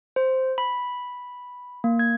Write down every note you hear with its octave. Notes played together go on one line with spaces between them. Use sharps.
C5
B5
A#3
G#6